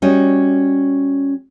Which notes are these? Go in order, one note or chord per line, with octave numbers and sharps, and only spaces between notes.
G3 C#4 F#4 D#5